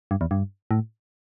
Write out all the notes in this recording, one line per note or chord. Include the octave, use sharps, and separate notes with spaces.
G2
E2
G2
A2